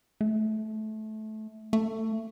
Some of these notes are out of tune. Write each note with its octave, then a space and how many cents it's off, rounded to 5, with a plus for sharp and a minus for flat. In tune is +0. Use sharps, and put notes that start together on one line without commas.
A3 -20
A3 +20